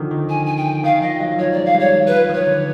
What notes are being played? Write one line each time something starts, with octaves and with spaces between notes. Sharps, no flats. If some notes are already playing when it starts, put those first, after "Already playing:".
Already playing: D3 D#3 F3
D#3
G#5
G#5
G5
D#3 F5
F3 D#5
F#3
F3
F#3 C#5
D5
G#3
F5
G3 C#5
F#3
F3 B4
D#3 C#5
D3